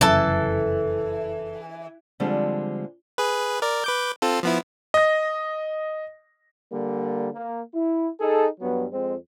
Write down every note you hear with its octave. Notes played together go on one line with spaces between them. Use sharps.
F1 F#2 C#3 E3 A4 A5
D3 F3 G3 G#3 C4 D4
G#4 B4
A#4 D5
B4 D6 G6
C4 F4 A4
F3 B3 E4
D#5 A#6
D3 G3 A#3
A#3
E4
D#4 G#4 A4
G2 F#3 B3
F2 G#3 C4